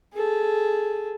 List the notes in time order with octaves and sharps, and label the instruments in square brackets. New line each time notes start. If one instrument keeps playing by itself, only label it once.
[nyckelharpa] G#4 A4